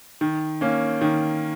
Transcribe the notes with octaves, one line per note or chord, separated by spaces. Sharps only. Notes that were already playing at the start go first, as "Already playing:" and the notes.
D#3
A#3 C#4
D#3